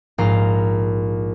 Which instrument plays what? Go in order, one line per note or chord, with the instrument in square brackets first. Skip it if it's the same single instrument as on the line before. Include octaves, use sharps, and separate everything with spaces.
[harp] A#1 G#2 F5 A#5